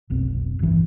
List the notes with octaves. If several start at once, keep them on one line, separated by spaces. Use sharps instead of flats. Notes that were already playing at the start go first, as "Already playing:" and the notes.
F1 B1 C4
G1 E3